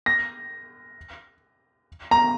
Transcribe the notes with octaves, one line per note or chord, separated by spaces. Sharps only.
A#6
A#5